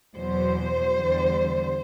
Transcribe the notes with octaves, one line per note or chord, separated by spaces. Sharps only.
E2 B2 F#3 C5
E2 D3 G3